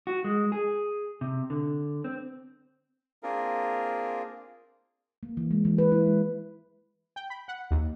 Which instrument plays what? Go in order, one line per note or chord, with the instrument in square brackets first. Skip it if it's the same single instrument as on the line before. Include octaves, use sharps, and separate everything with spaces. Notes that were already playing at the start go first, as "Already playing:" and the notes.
[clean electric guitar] F#4
G#3
G#4
C3
D3
C4
[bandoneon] A#3 C4 D4 F4 G#4 A#4
[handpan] A#3
E3
G#3
E3
B4
E4
G#3
[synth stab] G5
B5
F#5
D#2